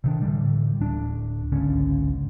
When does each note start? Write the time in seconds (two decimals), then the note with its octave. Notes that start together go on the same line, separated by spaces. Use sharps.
0.04 C3 D#3 D4
0.22 A2 D3 E3 G3
0.81 D1 D4
1.52 G#1 C#2 D3 C#4